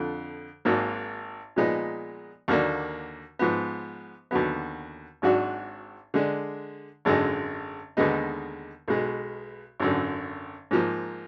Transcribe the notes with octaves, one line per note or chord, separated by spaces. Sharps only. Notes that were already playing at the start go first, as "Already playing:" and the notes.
Already playing: F2 D3 F3
G#1 G#2 F#3 A#3
A#2 F3 G#3 B3 D#4
D#2 D3 F#3 A#3 D4
G#2 F3 B3
D#2 D3 F#3 B3
G#1 G#2 F#3 D4 F#4
D3 G#3 D4
G#1 F#2 D3 G#3
D#2 D3 G#3 B3 D#4
B1 B2 G#3
G#1 F#2 D3
G#2 F3 A#3